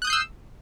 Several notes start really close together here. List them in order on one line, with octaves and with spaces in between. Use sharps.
F#6 D#6 G6 C7 E6